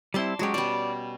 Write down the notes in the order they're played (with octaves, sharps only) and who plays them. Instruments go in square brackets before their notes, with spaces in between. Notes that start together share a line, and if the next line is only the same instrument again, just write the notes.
[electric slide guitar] G3 C4 E4 [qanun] D5 A5 C6
[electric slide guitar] F#3 G#3 G4 [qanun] C#4 F#4
[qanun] B2 G3 [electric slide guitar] D5